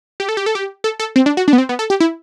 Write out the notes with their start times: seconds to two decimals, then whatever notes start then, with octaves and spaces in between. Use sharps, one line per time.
0.20 G4
0.29 A4
0.37 G4
0.46 A4
0.55 G4
0.84 A4
1.00 A4
1.16 C4
1.26 D4
1.37 F#4
1.48 D4
1.53 B3
1.58 C4
1.69 B3
1.79 A4
1.90 G4
2.00 E4